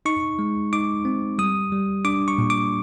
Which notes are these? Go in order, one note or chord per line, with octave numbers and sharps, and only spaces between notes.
D#4 C#6
G#3
D#4 D6
C4
G3 D#6
G3
D4 D6
C#6
A#2
D6